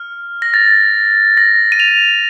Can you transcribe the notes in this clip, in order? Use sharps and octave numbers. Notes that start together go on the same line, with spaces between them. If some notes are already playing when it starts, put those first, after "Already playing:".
Already playing: F6
A#6
A6
A#6
D#7
F7